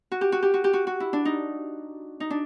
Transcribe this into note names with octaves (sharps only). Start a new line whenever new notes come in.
F#4
G4
F#4
G4
F#4
G4
F#4
F#4
E4
D4
D#4
D#4
D4